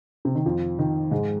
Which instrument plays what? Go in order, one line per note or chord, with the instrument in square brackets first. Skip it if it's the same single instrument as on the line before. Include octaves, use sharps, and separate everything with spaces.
[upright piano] C3
D#3
F2 F3
D#3
G#2 G#3